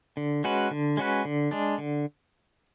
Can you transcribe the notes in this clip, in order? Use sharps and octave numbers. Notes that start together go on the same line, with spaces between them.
D3
G#3 C#4 F#4 B4
D3
G#3 C#4 F#4 B4
D3
G#3 D4
D3